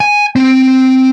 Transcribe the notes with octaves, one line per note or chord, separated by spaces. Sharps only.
G#5
C4